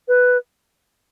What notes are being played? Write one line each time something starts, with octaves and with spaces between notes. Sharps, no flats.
B4